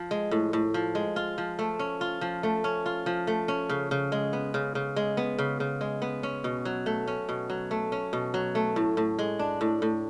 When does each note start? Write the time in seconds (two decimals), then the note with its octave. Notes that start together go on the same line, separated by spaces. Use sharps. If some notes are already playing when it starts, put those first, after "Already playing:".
Already playing: F3
0.11 G#3
0.31 A2
0.53 A2
0.74 F3
0.95 G#3
1.16 F4
1.38 F3
1.59 A3
1.79 C#4
2.01 F4
2.21 F3
2.43 A3
2.64 C#4
2.86 F4
3.06 F3
3.27 A3
3.48 C#4
3.69 C#3
3.91 C#3
4.12 G#3
4.33 B3
4.54 C#3
4.75 C#3
4.96 G#3
5.17 B3
5.39 C#3
5.60 C#3
5.81 G#3
6.02 B3
6.23 C#4
6.44 B2
6.65 F#3
6.86 A3
7.07 C#4
7.29 B2
7.50 F#3
7.71 A3
7.92 C#4
8.13 B2
8.34 F#3
8.55 A3
8.76 A2
8.97 A2
9.19 G#3
9.39 D4
9.61 A2
9.82 A2